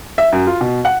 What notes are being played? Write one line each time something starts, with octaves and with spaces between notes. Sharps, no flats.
E5
F#2
F4
B2
F#5